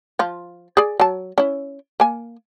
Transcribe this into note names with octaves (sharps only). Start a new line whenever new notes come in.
F3 F4
G#4 D5
F#3 A5
C#4 E4
A#3 G#5